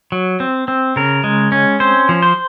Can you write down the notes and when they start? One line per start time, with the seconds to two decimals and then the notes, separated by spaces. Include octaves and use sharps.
0.12 F#3
0.40 C4
0.68 C4
0.96 C#3 A#4
1.24 G#3
1.52 C#4
1.80 C4 C5
2.09 F3
2.22 C5